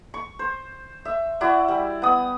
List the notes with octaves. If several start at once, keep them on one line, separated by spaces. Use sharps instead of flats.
C#6
C5
E5
E4 F#4 D5
G3
B3 D#6